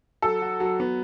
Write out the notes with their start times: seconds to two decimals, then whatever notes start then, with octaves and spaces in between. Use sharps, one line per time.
0.22 F#3 A4
0.42 F#4
0.60 F#3
0.80 B3